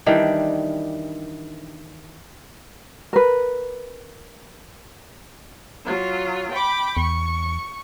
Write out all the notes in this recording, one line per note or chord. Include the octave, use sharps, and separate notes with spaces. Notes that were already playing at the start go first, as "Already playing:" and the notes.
D#3 E3 G3 D4
A#4 B4
F#3 F4
G5 B5 D6
E2 C#6